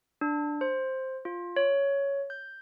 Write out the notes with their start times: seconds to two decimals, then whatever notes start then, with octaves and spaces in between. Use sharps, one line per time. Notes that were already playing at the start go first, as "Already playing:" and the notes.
0.21 D4
0.61 C5
1.25 F4
1.56 C#5
2.30 G6